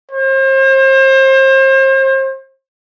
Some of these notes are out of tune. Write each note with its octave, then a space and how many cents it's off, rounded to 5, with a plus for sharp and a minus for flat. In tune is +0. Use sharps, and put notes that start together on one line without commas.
C5 +35